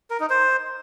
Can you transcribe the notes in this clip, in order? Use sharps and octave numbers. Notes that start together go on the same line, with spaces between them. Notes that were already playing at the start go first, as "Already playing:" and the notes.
A#4
D#4
C5